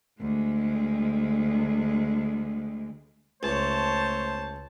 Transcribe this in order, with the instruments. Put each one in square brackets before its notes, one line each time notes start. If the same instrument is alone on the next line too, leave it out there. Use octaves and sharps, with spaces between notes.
[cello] D2 G#3
[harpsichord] C#2 [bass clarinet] A3 [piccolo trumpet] C5 [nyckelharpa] C#5 A5